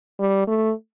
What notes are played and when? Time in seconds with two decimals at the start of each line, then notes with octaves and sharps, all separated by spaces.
0.20 G3
0.47 A3